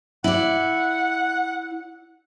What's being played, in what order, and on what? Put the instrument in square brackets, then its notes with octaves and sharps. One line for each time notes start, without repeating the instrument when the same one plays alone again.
[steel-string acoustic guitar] E4 D5 [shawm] F#5